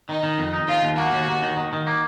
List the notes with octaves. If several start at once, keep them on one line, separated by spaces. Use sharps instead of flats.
D#3 D#4
D#3
F2
D#4
D#2 F4
D#2
A#3 F#4
D#2
D#2
D#3
D#3
D#3
A#3